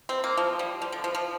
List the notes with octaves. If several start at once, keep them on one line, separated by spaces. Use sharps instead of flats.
C4
A#3
F3
G3
F3
D3
F3
F3